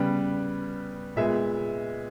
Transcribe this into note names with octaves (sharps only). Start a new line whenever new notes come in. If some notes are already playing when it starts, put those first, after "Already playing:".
Already playing: C#3 G3 B3 B4
A#2 G#3 B3 E5